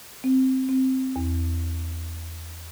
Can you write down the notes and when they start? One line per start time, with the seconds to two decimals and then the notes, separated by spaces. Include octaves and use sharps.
0.24 C4
0.69 C4
1.16 E2